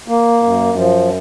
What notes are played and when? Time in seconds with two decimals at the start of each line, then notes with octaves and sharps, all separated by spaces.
0.08 A#3
0.43 F#2
0.78 F3